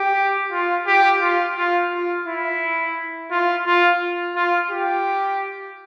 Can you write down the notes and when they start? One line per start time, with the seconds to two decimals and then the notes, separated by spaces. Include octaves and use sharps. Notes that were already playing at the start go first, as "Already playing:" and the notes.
Already playing: G4
0.52 F4
0.87 G4
1.21 F4
1.57 F4
1.92 F4
2.26 E4
3.31 F4
3.66 F4
4.36 F4
4.71 G4